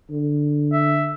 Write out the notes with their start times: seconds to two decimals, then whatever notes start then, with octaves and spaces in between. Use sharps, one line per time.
0.10 D3
0.73 E5